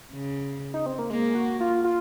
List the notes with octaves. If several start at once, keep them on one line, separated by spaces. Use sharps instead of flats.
C#3
D#4
C4
A#3
G#3 A#3
F#4
F4
F4